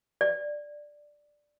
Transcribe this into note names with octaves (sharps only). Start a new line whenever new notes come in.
D5